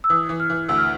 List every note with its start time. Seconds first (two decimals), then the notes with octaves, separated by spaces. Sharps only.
0.04 E6
0.10 E3 D#6
0.29 E3
0.40 F6
0.50 E3
0.69 D2 E6
0.77 F6